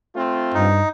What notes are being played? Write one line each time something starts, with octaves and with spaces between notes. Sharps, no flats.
A3 C4 F4
G2 D#4